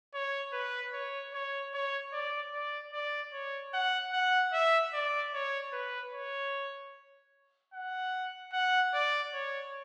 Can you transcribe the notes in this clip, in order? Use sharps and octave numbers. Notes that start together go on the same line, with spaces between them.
C#5
B4
C#5
C#5
C#5
D5
D5
D5
C#5
F#5
F#5
E5
D5
C#5
B4
C#5
F#5
F#5
D5
C#5